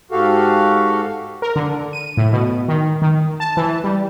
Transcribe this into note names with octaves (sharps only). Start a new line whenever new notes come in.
G#2 F#4 G4 A4 F5
A#4
D3
D#7
A2
B2
D#3
D#3
A5
E3
G3